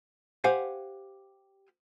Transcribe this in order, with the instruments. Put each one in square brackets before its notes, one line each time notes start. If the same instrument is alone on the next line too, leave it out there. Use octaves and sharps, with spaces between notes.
[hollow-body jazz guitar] G4 C5 F5 F#5 G#5